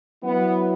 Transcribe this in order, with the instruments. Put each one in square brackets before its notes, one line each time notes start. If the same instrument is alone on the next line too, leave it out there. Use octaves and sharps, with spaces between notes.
[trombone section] F#3 E4 B4 [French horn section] B3